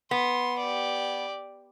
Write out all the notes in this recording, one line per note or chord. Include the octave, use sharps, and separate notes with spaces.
B3 C6
G4 D5